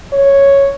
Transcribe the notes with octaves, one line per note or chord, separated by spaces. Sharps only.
C#5